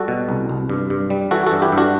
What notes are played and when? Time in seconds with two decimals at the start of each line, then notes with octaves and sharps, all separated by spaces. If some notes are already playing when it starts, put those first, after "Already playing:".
Already playing: G3 F#4 A4
0.08 B2
0.29 C2
0.49 C2
0.69 G2
0.90 G2
1.10 G3
1.31 E3 F#4 A4
1.46 F#4 A4
1.52 G2
1.62 E4 G4
1.72 G2
1.78 D4 F#4